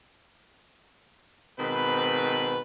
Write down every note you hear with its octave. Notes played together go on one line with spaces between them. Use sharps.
G#2 B2 D#3 C4 B4